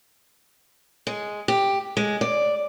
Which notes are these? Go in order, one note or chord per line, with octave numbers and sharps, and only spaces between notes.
G#3
G4
G#3
D5